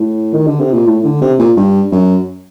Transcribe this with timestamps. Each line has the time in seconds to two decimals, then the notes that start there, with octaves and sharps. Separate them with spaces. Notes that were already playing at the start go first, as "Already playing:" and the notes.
Already playing: A2
0.33 D#3
0.47 D3
0.59 C3
0.73 A#2
0.86 A2
1.04 D3
1.21 C3
1.39 A#2
1.56 G2
1.92 F#2